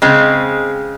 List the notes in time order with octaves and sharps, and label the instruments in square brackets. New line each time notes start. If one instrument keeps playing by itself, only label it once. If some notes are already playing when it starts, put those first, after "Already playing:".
[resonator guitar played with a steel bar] C#3 G#3 C4